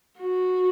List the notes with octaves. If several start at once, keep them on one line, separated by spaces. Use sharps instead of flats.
F#4